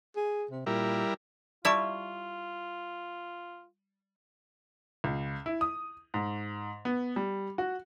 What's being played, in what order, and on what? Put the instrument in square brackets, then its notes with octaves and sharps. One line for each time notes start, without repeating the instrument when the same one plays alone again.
[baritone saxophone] G#4
C3
[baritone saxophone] A#2 [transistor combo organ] G3 E4 A#4
[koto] G3 E4 [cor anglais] F4 [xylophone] D5 A5 C#6
[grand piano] C#2
E4
D#6
G#2
B3
G3
F#4